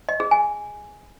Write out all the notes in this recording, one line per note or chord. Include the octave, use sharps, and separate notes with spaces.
D#5
G#4
G#5